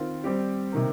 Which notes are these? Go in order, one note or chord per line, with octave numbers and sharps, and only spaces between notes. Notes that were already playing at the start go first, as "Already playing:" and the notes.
Already playing: D#3 C4 F4
G3 C4 G4
C3 D#3 A#3